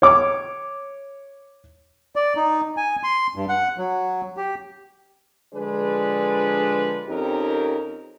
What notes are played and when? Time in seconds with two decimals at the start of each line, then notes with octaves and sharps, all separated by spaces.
0.02 C#5 D6
2.16 D5
2.36 D#4
2.77 G#5
3.03 C6
3.36 G2
3.49 F#5
3.78 F#3
4.37 G4
5.54 D3 F3 G#3 D4 G#4 B4
7.08 F2 C4 C#4 D#4 G4 A#4